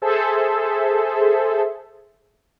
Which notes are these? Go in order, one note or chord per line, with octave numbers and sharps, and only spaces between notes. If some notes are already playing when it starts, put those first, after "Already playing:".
G#4 A4 C5 E5